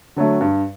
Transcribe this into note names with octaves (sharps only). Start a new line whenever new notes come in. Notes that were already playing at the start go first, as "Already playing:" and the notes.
D3 F#3 A3
G2